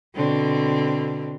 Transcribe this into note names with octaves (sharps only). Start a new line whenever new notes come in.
B2 D3 C4